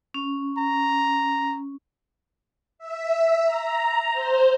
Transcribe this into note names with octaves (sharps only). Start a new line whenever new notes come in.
C#4
A#5
E5
A#5
C5